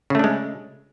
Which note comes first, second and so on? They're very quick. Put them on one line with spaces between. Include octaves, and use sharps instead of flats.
C#3 A3 D4 G#3